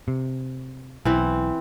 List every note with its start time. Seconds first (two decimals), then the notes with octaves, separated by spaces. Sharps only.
0.08 C3
1.05 B1 E3 C4